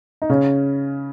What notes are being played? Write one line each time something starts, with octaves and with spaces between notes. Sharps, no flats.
D#4
C#3 C#4